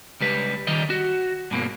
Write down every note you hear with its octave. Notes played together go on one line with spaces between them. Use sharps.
C#2 G3 B4
D#3 G3 D#5
F#4
G2 B2 A#3